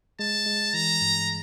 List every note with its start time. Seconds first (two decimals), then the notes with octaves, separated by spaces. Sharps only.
0.19 G#3 A5
0.46 G#3
0.74 E3 A#5
1.01 G2